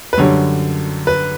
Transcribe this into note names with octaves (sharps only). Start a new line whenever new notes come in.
B4
F#2 D3 G3 C#5
B4